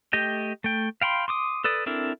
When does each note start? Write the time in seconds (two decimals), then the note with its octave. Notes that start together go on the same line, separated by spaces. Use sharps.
0.13 A3 G4 D#5 G5
0.64 A3 G5
1.02 F5 G5 B5 C6
1.28 C6 D6 D#6
1.64 A4 B4 D5 D#6
1.86 C4 D4 E4 A4 A#4